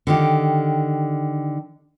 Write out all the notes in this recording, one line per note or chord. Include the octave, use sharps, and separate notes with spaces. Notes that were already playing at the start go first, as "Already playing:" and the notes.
D3 D#3 G4